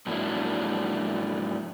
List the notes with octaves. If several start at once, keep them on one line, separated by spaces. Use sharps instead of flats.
G#2 F3 F#3 A#3 D4 E4